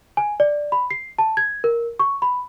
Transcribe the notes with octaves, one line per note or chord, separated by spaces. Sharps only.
G#5
D5
B5
C7
A5
G#6
A#4
C#6
B5